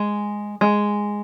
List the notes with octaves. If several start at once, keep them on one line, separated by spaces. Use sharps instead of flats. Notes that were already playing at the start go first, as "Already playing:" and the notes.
Already playing: G#3
G#3